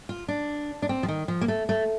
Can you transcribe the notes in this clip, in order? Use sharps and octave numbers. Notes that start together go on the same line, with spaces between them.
F4
D4
D4
C4
F3
D#3
F3
A#3
A3
A3